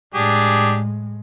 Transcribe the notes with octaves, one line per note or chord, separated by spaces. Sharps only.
A2 G#3 D4 G4 G#4